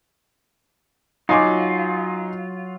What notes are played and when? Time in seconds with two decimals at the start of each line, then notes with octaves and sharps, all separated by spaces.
1.29 F#3 D#4 F4 G#5 D6